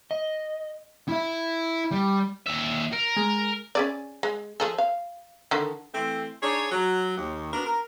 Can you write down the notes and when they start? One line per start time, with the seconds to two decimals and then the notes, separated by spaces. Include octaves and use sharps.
0.11 D#5
1.08 E4 E5
1.91 G3
2.47 D#2 E5
2.93 A#4
3.16 G#3
3.75 C#4 G#4 D5
4.23 G#3
4.60 F3 G#4 A4
4.78 F5
5.51 D3 D#3
5.94 E3 A3 C4
6.42 D4 D#4 G#4 C#5
6.72 F#3
7.17 D#2
7.53 B3 D4 F#4 A#4
7.66 A#4